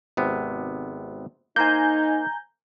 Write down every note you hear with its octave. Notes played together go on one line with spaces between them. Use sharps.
G#1 C3 B3
A#3 D#4 C5 G#5 A#5 G6